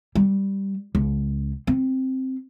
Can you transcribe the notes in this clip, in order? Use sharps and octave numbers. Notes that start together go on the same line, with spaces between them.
G3
C#2
C4